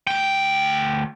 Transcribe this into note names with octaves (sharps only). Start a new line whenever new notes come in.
D2 G5